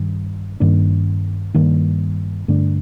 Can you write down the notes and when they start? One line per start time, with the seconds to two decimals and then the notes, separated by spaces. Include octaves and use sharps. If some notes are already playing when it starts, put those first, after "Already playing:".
Already playing: G2 D#3
0.60 G2 D#3 A#3 D4
1.54 G2 D#3 A#3
2.48 G2 D3 A3 D4